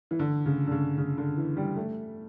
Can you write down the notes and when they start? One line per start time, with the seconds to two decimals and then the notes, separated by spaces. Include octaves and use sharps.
0.11 E3
0.19 D3
0.46 C#3
0.67 D3
0.71 C#3
0.98 C#3
1.18 D3
1.37 E3
1.57 G3
1.76 A3